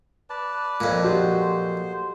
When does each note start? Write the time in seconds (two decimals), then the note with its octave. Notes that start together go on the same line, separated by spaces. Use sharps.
0.30 B4 D5 A5
0.80 F2 A#2
1.04 F#4 G4 C5